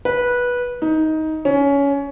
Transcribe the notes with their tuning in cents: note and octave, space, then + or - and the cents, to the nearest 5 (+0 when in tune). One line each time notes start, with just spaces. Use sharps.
B4 -15
D#4 +15
C#4 +20